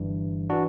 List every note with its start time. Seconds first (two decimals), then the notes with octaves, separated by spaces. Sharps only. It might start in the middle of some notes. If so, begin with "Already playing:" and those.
Already playing: G1 G2 E3
0.50 E3 D4 F#4